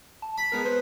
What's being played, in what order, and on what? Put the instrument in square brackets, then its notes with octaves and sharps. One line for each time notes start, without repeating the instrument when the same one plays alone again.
[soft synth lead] A5
[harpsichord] B5
[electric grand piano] G#3 B3 A#4
[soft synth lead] B4 [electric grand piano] C5